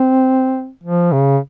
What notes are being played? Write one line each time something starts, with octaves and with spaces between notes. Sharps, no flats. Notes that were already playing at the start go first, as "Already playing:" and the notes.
Already playing: C4
F3
C#3